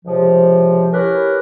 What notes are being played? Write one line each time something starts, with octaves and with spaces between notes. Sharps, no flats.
C#2 C3 F3
C#4 E4 G4 A#4 B4